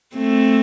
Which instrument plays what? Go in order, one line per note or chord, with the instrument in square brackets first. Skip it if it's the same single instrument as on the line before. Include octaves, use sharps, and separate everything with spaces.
[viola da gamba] A3 C4